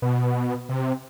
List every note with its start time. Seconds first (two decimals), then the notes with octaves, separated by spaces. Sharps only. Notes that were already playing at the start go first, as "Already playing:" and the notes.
0.02 B2
0.69 C3